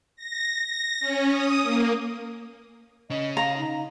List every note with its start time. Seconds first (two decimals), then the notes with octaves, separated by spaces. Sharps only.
0.16 A#6
0.64 A#6
1.00 C#4
1.30 D#6
1.62 A#3
3.10 C#3 C#4 D#5
3.37 F5 A#5
3.58 D#4